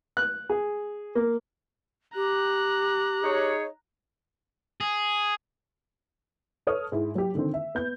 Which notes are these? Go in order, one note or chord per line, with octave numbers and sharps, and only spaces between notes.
F#6
G#4
A#3
G4 A#5 F#6
D#4 G#4 C#5
G#4
A4 B4 C#5 D#6 F6
G#2 E4
F#3 G4
D3 D#3 C4
E5
B3 G6